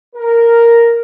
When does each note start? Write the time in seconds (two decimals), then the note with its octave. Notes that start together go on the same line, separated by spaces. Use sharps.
0.15 A#4